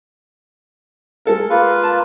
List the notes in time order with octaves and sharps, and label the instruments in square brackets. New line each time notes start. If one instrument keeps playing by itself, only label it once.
[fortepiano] G#3 A4 A#4
[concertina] A#3 F4 B4
[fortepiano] A5